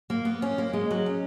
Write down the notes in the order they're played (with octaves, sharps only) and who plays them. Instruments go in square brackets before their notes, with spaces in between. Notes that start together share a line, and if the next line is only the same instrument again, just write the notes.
[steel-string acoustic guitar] A#3
B3
C#4
A#3
G#3
F#3
C#4